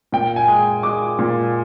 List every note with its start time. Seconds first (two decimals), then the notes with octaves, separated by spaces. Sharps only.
0.12 A#2 G5
0.36 G#5
0.48 G#3
0.83 G#3 D6
1.19 A#2